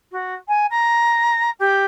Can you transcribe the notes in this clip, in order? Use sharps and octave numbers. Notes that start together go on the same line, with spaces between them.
F#4
G#5
A#5
G4